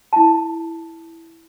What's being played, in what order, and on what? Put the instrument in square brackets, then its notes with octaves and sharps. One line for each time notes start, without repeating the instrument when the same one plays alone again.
[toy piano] E4 A5